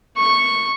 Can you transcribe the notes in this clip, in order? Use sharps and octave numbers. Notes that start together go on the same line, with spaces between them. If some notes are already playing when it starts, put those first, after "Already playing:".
C#6